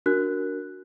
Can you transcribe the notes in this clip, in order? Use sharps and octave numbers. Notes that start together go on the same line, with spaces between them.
D4 F#4 A#4 F#6